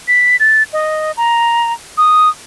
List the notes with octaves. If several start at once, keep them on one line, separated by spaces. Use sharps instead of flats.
B6
A6
D#5
A#5
D#6